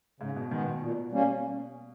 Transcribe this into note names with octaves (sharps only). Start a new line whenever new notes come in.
G#2 C#3
B2
D#3 G#3 B3
B2
A#2
G3 A#3 C#4